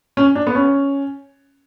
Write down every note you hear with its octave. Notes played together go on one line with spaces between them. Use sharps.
C#4
D4
B3
C#4